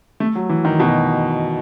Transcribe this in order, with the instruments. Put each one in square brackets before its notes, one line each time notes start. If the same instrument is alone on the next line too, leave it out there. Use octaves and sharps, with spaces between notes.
[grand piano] A3
F#3
E3
D#3
B2